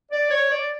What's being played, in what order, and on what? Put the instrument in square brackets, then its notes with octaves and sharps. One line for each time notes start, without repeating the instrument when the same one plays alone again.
[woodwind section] D5
C#5
D5